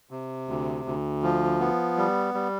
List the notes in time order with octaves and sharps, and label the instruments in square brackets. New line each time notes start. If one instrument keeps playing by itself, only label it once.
[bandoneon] C3
D2
D2
F3
B3
G3
G3